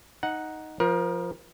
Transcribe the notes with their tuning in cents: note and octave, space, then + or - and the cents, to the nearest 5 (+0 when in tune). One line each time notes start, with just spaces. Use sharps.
D#4 +5 F#5 +0
F3 +0 A#4 +30